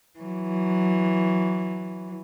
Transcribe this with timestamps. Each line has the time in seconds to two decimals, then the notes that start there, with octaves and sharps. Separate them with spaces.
0.19 E3 F#3